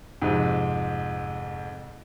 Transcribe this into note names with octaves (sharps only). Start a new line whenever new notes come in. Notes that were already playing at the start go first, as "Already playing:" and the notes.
F2 G#2 C3